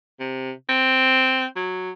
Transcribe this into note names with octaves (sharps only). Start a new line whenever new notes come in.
C3
C4
F#3